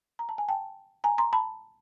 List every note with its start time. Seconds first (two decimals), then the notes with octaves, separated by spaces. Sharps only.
0.19 A#5
0.29 A5
0.38 G#5
0.49 G5 A5
1.04 G#5 A#5
1.18 A#5 C6
1.33 A5 B5